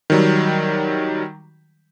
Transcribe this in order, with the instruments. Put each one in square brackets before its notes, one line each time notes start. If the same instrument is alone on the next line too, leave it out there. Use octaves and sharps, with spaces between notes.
[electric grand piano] D#3 F#3 G3